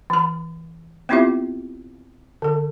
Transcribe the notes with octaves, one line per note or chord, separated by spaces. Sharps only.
E3 B5
B3 C4 E4 F4 G4 E5
D3 A4